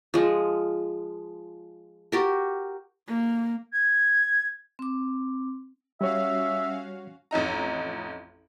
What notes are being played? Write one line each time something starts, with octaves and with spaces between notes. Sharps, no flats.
F3 G#3
F#4 G4 A#4
A#3
G#6
C4 D6
G3 C#4 F#4 C#5 E5 F5
A1 F2 D#4 A#5